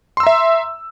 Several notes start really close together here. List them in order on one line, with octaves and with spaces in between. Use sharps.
C6 E6 A#5 E5